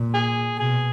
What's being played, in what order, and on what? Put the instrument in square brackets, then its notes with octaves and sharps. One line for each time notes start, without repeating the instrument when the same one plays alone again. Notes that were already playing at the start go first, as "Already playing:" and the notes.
Already playing: [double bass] A#2
[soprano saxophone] G#4
[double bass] B2 [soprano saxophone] G#4